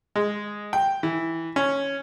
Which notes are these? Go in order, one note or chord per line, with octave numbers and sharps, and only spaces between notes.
G#3
G5
E3
C#4